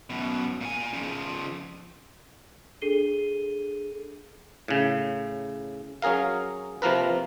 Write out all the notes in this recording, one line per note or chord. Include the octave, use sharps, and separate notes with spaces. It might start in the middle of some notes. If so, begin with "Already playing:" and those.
F#2 B2
A#2 G#5
C#3 F3
D4 G#4 A4 C7 D#7 G7
A2 C#3
F#3 C#4 G#4 A#4 F5
C3 F3 A#3 A#4 B4